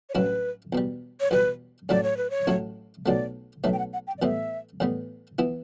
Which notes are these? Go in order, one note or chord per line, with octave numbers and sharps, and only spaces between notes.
C#5
A1 G2 F#3 C#4 E4 B4
E2 B2 G3
C#5
E2 B2 G3 B4
A1 A2 F#3 A3 E4 D5
C#5
B4
C#5
A1 A2 F#3 A3 E4
B1 B2 F#3 A3 D5
B1 B2 F#3 A3 E5
G5
F#5
F#5
G5
D5
A2 E3 G3 B3 E5
A2 E3 G3 B3
E3 B3 E4